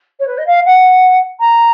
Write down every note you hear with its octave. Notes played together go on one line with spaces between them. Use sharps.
C#5
B4
D#5
F5
F#5
A#5